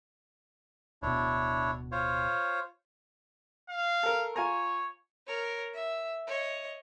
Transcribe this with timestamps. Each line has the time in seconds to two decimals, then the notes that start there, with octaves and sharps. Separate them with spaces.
1.02 D1 B2 D4 E4 C#5
1.92 F4 C5 C#5
3.69 F5
4.03 A4 A#4
4.36 F4 C#5 G#5 A#5
5.27 A#4 C#5
5.74 E5
6.27 C#5 D#5